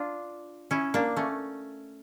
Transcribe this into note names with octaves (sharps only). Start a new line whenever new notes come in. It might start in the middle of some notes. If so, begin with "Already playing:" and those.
Already playing: D4 F4
C#4 E4
A#3 D4
A3 C#4